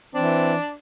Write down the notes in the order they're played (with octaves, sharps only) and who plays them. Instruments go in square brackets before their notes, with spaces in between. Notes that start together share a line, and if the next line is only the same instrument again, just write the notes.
[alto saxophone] E3 [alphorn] C4 [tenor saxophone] D4